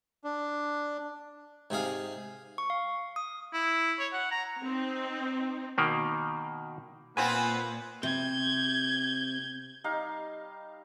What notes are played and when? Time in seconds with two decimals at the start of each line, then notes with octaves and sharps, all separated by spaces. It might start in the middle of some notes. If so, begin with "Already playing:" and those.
0.24 D4
1.70 G#2 C3 G#4 F5
2.58 C#6
2.70 F5
3.16 D#6
3.54 E4
3.99 C#5
4.13 F#5
4.31 A#5
4.63 C4 D#4
5.78 B2 D#3 A#3
7.17 A#2 B3 C4 F4 B4 G#5
8.03 C3 G6 G#6
9.84 G3 D#4 F5